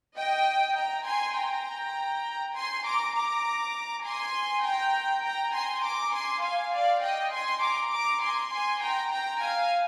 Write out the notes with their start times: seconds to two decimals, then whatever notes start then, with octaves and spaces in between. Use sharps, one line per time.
0.16 D#5 G5
0.76 G5 A#5
1.06 G#5 C6
1.36 G5 A#5
2.55 G#5 C6
2.86 A#5 D6
3.15 A#5 D6
4.05 G#5 C6
4.64 G5 A#5
5.24 G5 A#5
5.54 G#5 C6
5.84 A#5 D6
6.14 G#5 C6
6.43 F5 G#5
6.74 D5 F5
7.03 D#5 G5
7.33 G#5 C6
7.63 A#5 D6
7.93 A#5 D6
8.23 G#5 C6
8.53 G#5 C6
8.82 G5 A#5
9.12 G5 A#5
9.42 F5 G#5